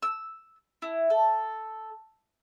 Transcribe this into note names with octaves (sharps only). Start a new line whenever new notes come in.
E6
E4
A4